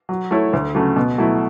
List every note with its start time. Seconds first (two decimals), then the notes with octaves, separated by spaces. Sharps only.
0.09 F#3
0.31 A3 E4 A4 C#5
0.53 D2
0.75 C#3 F#3 A3
0.96 B2
1.18 F#3 A3 E4